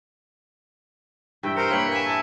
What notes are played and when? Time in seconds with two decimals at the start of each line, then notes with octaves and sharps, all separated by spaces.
1.43 G2 E3 E5 G5
1.56 A#4 C5 G5 A#5 C#7
1.71 A#3 A#4 B4 C#5 B6 F#7
1.92 G#5 B6 E7
2.05 E4 A4 A5